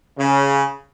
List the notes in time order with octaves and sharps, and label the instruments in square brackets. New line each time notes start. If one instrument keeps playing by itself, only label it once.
[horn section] C#3